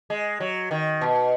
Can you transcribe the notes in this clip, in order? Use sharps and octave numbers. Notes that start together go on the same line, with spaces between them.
G#3
F#3
D#3
B2